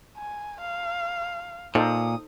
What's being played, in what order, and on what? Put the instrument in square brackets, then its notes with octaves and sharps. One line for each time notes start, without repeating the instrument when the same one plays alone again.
[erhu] G#5
F5
[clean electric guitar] A#2 [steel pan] D#4 A4 C5 [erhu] D#6